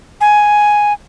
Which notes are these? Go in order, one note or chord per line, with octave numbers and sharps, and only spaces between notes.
G#5